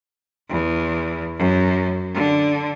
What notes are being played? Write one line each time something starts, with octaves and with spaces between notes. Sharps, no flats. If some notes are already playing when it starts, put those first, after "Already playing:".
E2
F#2
D3